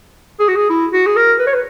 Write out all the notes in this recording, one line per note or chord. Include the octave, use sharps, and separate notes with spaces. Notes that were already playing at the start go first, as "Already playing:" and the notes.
G#4
F#4
G#4
E4
F#4
G#4
A#4
B4
C#5
B4